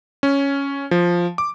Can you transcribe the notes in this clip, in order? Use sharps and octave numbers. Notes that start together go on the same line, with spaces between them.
C#4
F3
D6